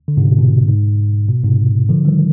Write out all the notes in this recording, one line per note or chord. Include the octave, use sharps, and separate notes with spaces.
D3
G#2 C3
B2
B2
G#2
B2
G#2 C3
D3 F3
D#3 G3